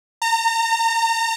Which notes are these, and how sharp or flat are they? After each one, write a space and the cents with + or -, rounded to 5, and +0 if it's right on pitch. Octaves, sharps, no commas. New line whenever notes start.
A#5 -35